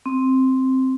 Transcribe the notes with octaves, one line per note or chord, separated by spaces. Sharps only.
C4